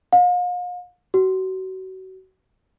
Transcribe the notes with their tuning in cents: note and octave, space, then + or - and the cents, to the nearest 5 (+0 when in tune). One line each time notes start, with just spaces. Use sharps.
F5 +40
F#4 +30